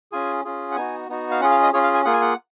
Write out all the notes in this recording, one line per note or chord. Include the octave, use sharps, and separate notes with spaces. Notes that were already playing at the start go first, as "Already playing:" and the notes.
C#4 F4 G#4 G#5
C#4 F4 G#4
F#5
B3 D#4 F#4 G#5
B3 D#4 F#4
F5
C#4 F4 G#4 F#5
F5
D#5
C#4 F4 G#4 C#5
F5
G#5
A#3 F4 G#4 F#5
G#5
F#5